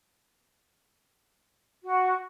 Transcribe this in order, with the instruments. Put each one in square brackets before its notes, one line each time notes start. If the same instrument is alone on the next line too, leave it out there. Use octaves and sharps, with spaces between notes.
[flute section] F#4